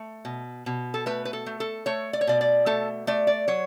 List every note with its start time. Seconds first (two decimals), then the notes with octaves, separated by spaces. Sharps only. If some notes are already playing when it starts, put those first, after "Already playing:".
Already playing: A3
0.25 B2
0.66 B2
0.94 A4
1.06 A3 B4
1.25 B4
1.33 A4
1.46 A3
1.60 A4
1.86 A3 C#5
2.13 D5
2.21 C#5
2.27 B2 D5
2.41 D5
2.66 A3 A4
3.07 A3 D5
3.27 D5
3.48 F#3 C#5